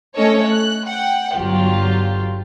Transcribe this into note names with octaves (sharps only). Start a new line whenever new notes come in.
A3 C#4 A4 C#5 D#5
F#6
F#5 G5
G1 F#3 F4 G4